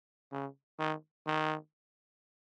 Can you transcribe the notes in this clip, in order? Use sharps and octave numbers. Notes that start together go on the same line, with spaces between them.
C#3
D#3
D#3